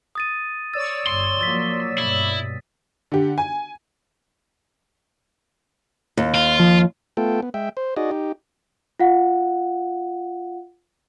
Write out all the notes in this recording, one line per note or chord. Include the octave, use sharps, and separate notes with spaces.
D#6 A6 D#7
C#5 D5 E6 A6
G1 C6
F3 F#3 A#3 A6 B6
G2 B2 E4
D3 G4
G#5
D#2
F4
F3
A3 B3 F4 A4 G5
B3
G#3 E5 G5
C5
D#4 F#4 G#4 D5 D#5
D#4 G4
F4 F5 F#5